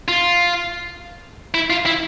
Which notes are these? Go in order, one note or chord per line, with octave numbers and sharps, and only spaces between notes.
F4
E4
F4
E4